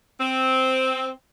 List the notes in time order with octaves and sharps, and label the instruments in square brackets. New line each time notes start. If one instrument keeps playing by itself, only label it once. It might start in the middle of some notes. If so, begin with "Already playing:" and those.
[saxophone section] C4